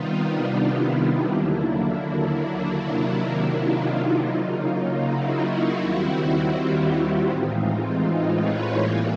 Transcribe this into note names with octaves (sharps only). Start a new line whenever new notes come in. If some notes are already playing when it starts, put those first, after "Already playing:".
Already playing: C3 D#3 G3 B3 D#4 F4
D4
D4 E4
D4 E4
D#2 D3 F#3 A#3 D4 E4
C3 D#3 F#3 A#3
D#4 F4
C#3 F#3 A#3
E4 F#4
D#2 D#3 G3 C4
F4 G4
A2 E3 G#3 C4 D#4 F4
D#4 F4
B4 C#5
A2 E3 G3 A#3